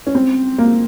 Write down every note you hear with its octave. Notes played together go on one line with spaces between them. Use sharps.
C#4
C4
A#3